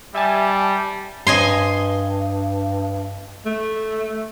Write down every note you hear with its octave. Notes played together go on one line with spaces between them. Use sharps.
G3 E5 G#5 A5
G2 D#5 G#5 C6
A3